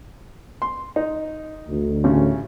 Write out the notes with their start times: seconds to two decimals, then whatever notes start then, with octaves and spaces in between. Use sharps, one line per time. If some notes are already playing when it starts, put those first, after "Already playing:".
0.62 C6
0.96 D#4
1.69 D2
2.04 A1 C#3